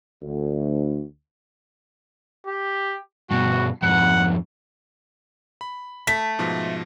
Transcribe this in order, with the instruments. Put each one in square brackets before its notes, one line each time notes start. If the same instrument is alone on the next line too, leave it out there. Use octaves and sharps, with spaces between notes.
[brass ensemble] D2
[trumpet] G4
[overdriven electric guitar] G2 B2 [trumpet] F#4
[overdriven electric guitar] F2 G#2 [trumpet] F#5
[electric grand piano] B5
[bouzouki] A3 [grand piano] B6
[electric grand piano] G#2 B2 F3